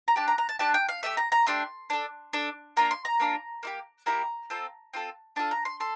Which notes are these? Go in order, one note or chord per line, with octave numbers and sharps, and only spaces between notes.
A#5
D4 G4 A5
A#5
A#5
A5
D4 G4 A5
G5
F5
A3 D4 G4 E5
A#5
A#5
A3 D4 G4 C6
D4 A4
D4 A4
A#3 D4 F4 A#5
C6
A#5
A#3 D4 F4
A#3 E4 G4
A#3 E4 G4 A#5
C4 F4 A4
C4 F4 A4
D4 F4 A4 A5
A#5
C6
A4 C6